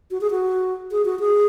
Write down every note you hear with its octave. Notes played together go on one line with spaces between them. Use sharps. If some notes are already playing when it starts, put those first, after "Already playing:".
F#4
G#4
F#4
G#4
F#4
G#4